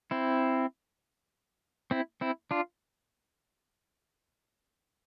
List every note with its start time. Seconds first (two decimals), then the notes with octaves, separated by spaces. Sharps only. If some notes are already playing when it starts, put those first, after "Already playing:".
0.11 C4 E4
1.91 C4 E4
2.21 C4 E4
2.51 D4 F4